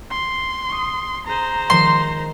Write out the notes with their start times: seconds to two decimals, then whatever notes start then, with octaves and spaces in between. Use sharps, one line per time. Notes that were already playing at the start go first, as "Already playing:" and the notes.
0.11 C6
0.69 C#6 D#6
1.27 G#4 C5 A#5 D#7
1.70 D#3 F3 G#3 C6